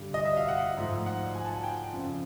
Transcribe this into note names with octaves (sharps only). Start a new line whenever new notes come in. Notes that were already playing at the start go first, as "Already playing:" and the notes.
Already playing: G2 D3 G3
D#5
E5
F5
F#5
G#2 F3 A3
F#5
G#5
A5
G#5
G5
F2 C#3 F3